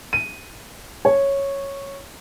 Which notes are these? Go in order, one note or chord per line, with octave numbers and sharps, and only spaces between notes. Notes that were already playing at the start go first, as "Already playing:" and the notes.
D#7
C#5